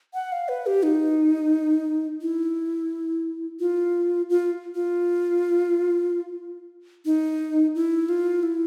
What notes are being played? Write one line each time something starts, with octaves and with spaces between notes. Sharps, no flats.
F#5
F5
B4
G4
D#4
E4
F4
F4
F4
D#4
E4
F4
E4